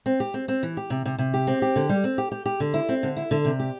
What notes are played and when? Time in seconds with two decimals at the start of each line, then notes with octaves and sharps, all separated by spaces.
0.06 C4
0.20 G4
0.34 C4
0.48 C4
0.63 E3
0.77 G4
0.90 C3
1.06 C3
1.18 C3
1.34 G4
1.47 C4
1.62 G4
1.76 D3
1.89 G3
2.04 C4
2.18 G4
2.32 G4
2.46 G4
2.60 D3
2.74 E4
2.89 C4
3.03 D3
3.17 E4
3.31 D3
3.45 C3
3.60 G4